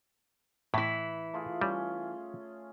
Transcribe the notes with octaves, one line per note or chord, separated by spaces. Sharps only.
A2 E3 E4
A3 F4 G#4
G3 C#4